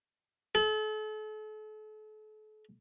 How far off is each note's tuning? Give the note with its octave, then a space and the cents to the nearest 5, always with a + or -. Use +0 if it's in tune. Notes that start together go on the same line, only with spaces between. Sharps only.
A4 -40